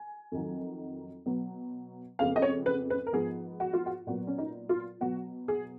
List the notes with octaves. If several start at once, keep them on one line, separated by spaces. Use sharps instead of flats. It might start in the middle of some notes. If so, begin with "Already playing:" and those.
Already playing: G#5
F2 D#3 F#3
B2 F#3 B3
F2 C#3 G#3 B3 F5
D#5
C#5
B4
B4
A#4
G#2 F3 B3 G#4
F#4
F4
F#4
A#2 F#3 B3 F#4
C#4
D#4
F4
B2 F#3 B3 F#4
G#4